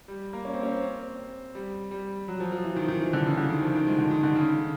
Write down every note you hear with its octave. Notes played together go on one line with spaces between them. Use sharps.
G3
A#3
C#4
C4
C#4
C4
G3
G3
F#3
F3
F3
E3
D#3
D#3
E3
D3
C#3
D3
D#3
F3
D#3
G#3
D3
D#3
D3
C#3